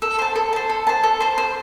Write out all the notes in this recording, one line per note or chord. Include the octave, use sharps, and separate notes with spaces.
A4
C5 A5
A4
C5 A5
A4
C5 A5
A4
C5 A5
C5